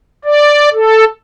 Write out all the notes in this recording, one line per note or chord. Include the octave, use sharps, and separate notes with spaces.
D5
A4